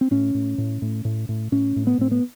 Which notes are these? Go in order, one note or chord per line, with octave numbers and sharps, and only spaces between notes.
C4
A2 C#4
A2
A2
A2
A2
A2
A2 C#4
A2
B3
A2 C4
B3